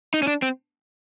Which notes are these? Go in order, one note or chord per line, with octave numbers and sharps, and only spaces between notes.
D#4
C#4
D4
C4